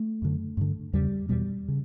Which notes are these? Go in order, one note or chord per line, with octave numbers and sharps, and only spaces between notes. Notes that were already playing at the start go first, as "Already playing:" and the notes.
Already playing: A3
F#2 D3
G2 D3
E2 C#3 G3
E2 B2 G3
C#3